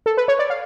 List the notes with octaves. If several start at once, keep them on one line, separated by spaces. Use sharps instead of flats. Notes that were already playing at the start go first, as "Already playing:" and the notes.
A4
B4
C#5
D5
F5